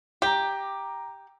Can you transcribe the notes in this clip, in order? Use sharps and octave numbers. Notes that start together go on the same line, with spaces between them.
G4 A#5 D6